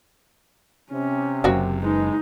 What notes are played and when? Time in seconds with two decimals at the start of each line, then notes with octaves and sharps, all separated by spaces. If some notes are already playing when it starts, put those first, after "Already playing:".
0.92 C3 C#4
1.44 F#1 F#2 A#3 C4 F#4
1.82 G#3 D#4 B4